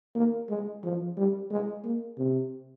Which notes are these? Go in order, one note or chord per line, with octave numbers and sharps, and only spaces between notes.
A#3
G#3
F3
G3
G#3
A#3
C3